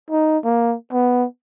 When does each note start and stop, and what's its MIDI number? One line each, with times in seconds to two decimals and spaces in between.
0.11 0.38 63
0.44 0.75 58
0.92 1.26 59